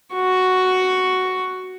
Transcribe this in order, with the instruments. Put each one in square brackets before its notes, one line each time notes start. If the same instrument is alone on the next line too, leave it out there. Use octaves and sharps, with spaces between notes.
[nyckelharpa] F#4 C#6